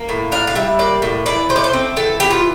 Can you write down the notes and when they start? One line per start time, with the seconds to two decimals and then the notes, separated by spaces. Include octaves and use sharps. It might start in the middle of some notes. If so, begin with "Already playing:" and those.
Already playing: A#3
0.09 A2
0.32 D4 F5
0.47 F5
0.55 G3 E5
0.79 A#3 D5
1.02 A2
1.26 E3 D5
1.49 A3 C5
1.56 D5
1.64 C5
1.73 C4
1.96 E3 A4
2.20 E3 G4
2.31 F4